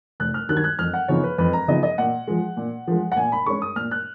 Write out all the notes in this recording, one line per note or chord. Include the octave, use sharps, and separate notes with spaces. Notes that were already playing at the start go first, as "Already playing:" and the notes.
F1 F#6
F6
D#2 D#3 F#3 F#6
G#6
F#6
F2 F6
F#5
C#3 F3 B3 D#4 C#5
B4
F2 B4
A#5
C#3 F3 B3 D#4 D#5
D#5
A#2 F#5
F3 G#3
A#2
F3 G#3
F#5
A#2 G#5
B5
G#3 C#4 C#6
D#6
A#2 F6
F#6